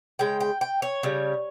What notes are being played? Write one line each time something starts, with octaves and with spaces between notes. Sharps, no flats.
C#3 G#3 G5
G5
G5
C#5
C#3 G3